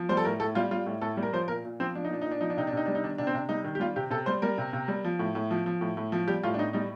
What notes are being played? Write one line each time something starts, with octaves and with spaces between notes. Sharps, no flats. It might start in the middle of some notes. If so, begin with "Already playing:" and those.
Already playing: F3
G3 C5
A4
A2 A#4
A2 A4
G3 F4
G3 F4
A2
A2 A4
G3
A#4
F3 C5
A#2 A#4
A#2
F3 C4
F3 D4
D#4
A#2 D4
A#2 D#4
D4
F3 D#4
D4
C3 D#4
D4
C3 D#4
G3 D4
D#4
D#3 D4
C3 D4
C4
C3 D4
G3 D#4
D#3
G4
G3 F4
C3 G4
C3 A4
G3 C5
G3 A#4
C3
C3
G3
F3
A2
A2
F3
F3
A2
A2
F3
G3 G4
A2 F4
D4
A2 D#4
G3 D#4